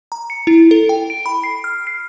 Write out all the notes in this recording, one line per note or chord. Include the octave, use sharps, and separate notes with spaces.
A#5
C#7
E4
A4
G5
D7
B5
C7
F6
C7